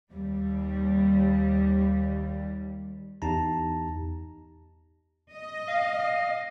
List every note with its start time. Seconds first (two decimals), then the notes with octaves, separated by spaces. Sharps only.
0.12 D#2 G3
3.22 E2 D#4 G4 A5 A#5
5.33 D#5
5.68 F5